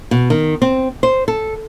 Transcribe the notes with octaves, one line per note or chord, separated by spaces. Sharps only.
B2
D#3
C4
C5
A4